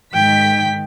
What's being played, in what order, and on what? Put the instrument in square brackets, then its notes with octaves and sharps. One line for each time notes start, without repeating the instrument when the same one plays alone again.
[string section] G#2 D#3 B6 [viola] G5